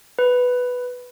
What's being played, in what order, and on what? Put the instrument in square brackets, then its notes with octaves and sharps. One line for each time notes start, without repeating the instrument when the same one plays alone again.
[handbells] B4